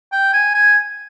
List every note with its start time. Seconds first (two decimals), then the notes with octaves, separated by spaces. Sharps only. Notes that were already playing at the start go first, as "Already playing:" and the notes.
0.12 G5
0.33 G#5
0.55 G#5